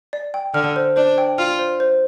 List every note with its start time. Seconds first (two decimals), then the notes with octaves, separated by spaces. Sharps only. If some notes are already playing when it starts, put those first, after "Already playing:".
0.13 D5
0.34 G5
0.54 D3 F6
0.76 C5
0.96 D4 C5
1.18 G5
1.38 F4 F6
1.59 C5
1.80 C5